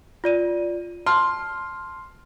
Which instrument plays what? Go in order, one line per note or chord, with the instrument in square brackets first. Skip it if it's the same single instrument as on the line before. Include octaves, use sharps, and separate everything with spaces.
[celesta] F4 D5 D#7
[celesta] A5 F6 [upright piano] C6